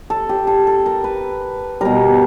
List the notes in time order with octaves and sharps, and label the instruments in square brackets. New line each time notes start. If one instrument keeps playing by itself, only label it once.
[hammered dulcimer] A4
G4
A4
A4
A#4
B4
B2 G3 A#4